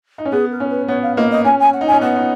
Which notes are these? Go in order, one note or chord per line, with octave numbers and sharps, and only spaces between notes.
D#4
C#4
B3 G#4
A#4
C#4
B4
B3 C#5
F5
A#3 D#5
D#5
C#4 G#5
G#5
F#5
D#4
C#4 G#5
B3 F#5
D#4